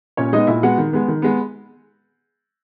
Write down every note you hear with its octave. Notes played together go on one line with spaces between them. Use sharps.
A#2 C#4 C#5
G#3 B3 D#4 D#5
A#2 E4 E5
G#3 B3 F#4 F#5
D#3
G#3 B3
D#3
G#3 B3